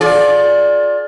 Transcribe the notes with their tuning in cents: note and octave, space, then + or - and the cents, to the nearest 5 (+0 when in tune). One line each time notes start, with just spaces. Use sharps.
F4 +25 G#4 +35 D5 +0